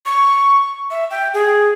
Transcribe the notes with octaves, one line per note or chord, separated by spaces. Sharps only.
C#6
E5
G5
G#4